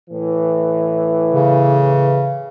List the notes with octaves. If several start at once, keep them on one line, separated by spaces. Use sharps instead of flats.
A2 E3
C#3